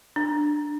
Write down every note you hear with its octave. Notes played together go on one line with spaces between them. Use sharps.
D4